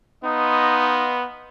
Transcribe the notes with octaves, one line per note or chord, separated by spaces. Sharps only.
B3 D#4 D#5 F5 C6